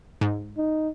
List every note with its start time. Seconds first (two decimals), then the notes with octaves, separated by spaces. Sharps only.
0.21 G#2
0.58 D#4